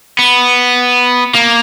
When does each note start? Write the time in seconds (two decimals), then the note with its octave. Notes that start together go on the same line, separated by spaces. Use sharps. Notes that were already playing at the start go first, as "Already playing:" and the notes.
0.19 B3
1.35 A#3